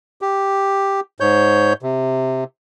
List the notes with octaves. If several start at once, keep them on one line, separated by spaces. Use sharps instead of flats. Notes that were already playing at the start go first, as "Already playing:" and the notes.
G4
G#2 C#5 G6
C3